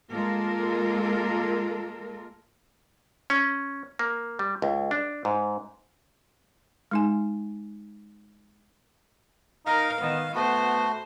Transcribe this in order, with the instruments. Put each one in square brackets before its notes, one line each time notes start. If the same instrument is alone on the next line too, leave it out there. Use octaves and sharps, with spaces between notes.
[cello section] G#3 A#3 F4 A4 A#4
[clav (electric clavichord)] C#4
A#3
G3
C#2
D4
G#2
[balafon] G#3 D#4 G#5
[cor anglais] D#4 [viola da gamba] A#4 [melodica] F5
[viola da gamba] D#3 [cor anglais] B3
[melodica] A3 F#4 [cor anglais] B3 [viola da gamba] C5